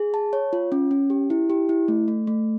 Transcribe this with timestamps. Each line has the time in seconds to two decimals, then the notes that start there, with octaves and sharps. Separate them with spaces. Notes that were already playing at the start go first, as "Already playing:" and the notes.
Already playing: G#4
0.14 A5
0.33 C#5
0.53 F4
0.72 C#4
0.91 C#4
1.10 G4
1.30 E4
1.50 G4
1.69 E4
1.88 A3
2.08 A3
2.27 A3